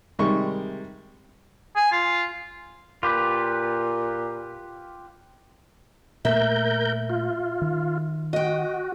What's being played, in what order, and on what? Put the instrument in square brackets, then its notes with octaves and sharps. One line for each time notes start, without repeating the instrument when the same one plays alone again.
[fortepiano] C3 D#3 G3 G#3 C#6
[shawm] G#5
F4
[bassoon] A#2 [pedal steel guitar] F4 G4 B4
[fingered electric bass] A#2 A3 [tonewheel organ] A#4 G6 [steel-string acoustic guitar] E5
[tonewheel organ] F4
[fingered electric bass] D#3
[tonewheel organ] F#4 [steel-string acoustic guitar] D#5 G5